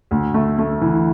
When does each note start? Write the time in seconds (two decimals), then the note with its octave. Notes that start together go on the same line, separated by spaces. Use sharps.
0.11 D2
0.34 A3
0.59 A3
0.81 E3